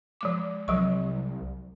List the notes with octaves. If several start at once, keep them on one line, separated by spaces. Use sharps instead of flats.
F3 G#3 D6
C2 F3 F#3 C#6